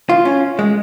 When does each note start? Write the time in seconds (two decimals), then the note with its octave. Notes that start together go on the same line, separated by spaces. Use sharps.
0.09 F4
0.25 C#4
0.59 G#3